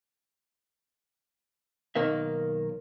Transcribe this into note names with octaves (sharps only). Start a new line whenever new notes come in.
B1 D#3 A#3 E5